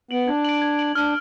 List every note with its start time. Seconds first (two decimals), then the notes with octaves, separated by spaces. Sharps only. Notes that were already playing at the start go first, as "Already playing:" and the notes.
0.11 B3 D7 F#7
0.28 D4 G#6
0.45 D7 F#7
0.62 G#6
0.79 D7 F#7
0.95 D4 F6